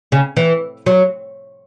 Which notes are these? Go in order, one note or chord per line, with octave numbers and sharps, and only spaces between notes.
C#3
E3
F#3